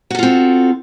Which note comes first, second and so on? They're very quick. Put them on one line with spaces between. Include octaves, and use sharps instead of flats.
F#4 A4 F4 C4